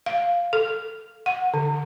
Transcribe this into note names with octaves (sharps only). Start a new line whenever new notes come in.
F5
A4
F#5
D3